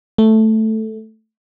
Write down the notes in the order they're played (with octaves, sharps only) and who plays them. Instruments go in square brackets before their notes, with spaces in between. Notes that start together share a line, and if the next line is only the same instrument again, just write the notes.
[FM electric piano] A3